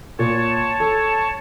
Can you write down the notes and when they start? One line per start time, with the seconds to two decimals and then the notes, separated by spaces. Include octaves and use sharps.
0.19 A#2 C#5 A5
0.80 A4